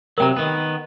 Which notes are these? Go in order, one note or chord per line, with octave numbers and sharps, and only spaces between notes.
C3 F#3 A#4 G5 A#5
D#3 B3